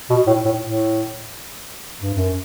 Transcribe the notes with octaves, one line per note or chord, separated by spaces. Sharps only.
B2
A2
A2
A2
G2
F#2